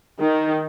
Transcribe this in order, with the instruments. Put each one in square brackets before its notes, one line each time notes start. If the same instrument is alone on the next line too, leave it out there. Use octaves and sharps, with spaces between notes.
[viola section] D#3